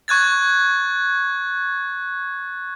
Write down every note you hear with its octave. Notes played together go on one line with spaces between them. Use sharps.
C#6 F#6 G#6 A6